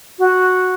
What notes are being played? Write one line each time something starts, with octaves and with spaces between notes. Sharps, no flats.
F#4